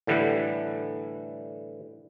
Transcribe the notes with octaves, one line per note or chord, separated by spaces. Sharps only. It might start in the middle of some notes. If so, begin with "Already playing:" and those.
A2 D3 E3 G3 F#5